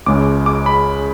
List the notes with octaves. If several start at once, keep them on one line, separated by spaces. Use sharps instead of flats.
C#2 C#3 G#3 D6
D6
B5